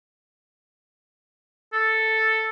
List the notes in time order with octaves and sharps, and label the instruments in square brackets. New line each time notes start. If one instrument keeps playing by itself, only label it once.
[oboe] A4